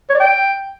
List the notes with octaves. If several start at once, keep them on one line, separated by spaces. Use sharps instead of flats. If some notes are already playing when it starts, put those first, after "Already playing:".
C#5
D5
G5